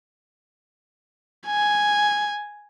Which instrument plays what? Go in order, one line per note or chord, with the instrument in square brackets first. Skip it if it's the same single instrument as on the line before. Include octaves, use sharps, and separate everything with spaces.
[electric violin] G#5